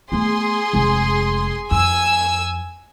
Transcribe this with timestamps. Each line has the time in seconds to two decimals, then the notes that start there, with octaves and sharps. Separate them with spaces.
0.12 A3 B3 G#4 C6
0.73 F1 G#3
1.71 F2 G#5 E6